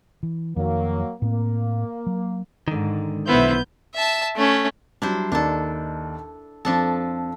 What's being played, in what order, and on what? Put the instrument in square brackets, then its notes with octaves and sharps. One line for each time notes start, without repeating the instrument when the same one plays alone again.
[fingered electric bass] E3
[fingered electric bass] F2 D#3 [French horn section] F#3 A#3
[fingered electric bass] A2 C4 [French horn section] A#3
[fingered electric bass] F#3
[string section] G#2 [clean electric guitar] D3 D#3
[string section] B1 G6 [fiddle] B3 [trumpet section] E4 C5 E5
[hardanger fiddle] E5 A5
A3 C#4
[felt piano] F#3 G3 [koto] D4 E4 C5
[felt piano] D#2 D#4 D5 [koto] D4 A4
[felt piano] F2 C4 [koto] F3 D4 A4